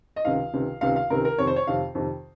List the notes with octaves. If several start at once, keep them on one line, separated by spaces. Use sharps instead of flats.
D#5
C#2 C3 D#3 F5
C#2 C3 D#3
C#2 C3 D#3 F5
F5
C#2 C3 D#3 A#4
A#4
F2 C3 D#3 C#5
C5
C#5
F2 C3 D#3 F5
F2 C3 D#3